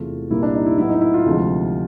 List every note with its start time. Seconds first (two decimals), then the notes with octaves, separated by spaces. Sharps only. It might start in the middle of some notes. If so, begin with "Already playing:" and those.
Already playing: E2 C3 E3 A3 F4
0.30 C2 A#2 G3 A#3 E4
0.43 D4
0.55 D#4
0.66 E4
0.78 A2 F#3 B3 E4
0.89 D#4
1.01 E4
1.14 F4
1.26 D2 C3 F3 G#3